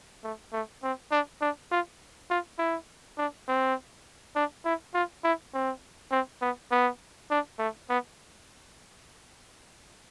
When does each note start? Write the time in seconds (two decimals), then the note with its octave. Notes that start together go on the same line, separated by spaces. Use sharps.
0.24 A3
0.53 A3
0.83 C4
1.12 D4
1.41 D4
1.71 F4
2.30 F4
2.58 E4
3.18 D4
3.48 C4
4.36 D4
4.65 E4
4.94 F4
5.24 E4
5.54 C4
6.11 C4
6.41 B3
6.71 B3
7.30 D4
7.59 A3
7.89 B3